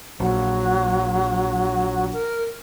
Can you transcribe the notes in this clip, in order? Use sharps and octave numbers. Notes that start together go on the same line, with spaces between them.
A#1 F#3
A#4